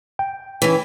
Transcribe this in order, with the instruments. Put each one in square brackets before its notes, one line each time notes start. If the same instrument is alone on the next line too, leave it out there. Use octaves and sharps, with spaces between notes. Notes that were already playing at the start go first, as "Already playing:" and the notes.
[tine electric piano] G5
[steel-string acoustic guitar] E3 C#4